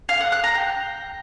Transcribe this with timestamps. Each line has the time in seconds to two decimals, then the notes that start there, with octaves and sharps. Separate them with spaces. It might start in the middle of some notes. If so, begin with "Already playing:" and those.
0.09 F5
0.20 F#5
0.32 F#6
0.44 A#5
0.55 G5